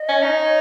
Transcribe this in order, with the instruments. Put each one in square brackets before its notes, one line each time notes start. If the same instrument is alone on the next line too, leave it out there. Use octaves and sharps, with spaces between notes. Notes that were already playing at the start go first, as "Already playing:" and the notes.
Already playing: [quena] D#5
[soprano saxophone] C#4
D#4
[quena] C#5